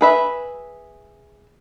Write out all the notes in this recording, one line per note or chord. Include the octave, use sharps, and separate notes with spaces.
G#4 B4 E5